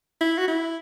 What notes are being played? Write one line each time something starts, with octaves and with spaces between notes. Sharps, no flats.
E4
F#4
E4